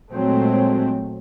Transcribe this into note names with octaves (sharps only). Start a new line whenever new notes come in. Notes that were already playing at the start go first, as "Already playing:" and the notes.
A#2 F#3 G#3 A3 C4